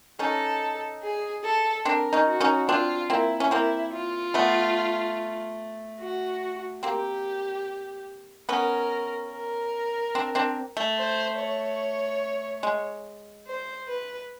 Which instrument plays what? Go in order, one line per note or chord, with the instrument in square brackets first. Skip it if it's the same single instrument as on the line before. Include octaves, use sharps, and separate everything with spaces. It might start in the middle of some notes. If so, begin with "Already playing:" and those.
[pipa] C#4 D#4 [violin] A4
[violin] G#4
A4
[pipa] C4 D4 [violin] A#4
[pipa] C#4 D#4
[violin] F#4
[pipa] C#4 D#4
[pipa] C4 D4 [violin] F4
[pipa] A#3 C4 [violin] E4
[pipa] C#4
[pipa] A#3 C4 [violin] E4
[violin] F4
[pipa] A3 B3
[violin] F#4
[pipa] A#3 C4 [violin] G4
[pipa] B3 C#4 [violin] A#4
[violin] A#4
[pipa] C4 D4
C4 D4
A3
[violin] C5
C#5
[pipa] G#3
[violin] C5
B4